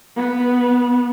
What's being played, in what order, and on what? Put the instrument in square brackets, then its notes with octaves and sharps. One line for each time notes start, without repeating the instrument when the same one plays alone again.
[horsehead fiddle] B3